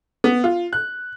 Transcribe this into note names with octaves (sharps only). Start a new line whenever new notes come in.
B3
F4
F#6